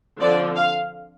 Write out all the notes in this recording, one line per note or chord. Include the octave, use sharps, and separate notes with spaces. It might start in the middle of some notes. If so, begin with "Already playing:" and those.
D3 F3 C4 D5
F5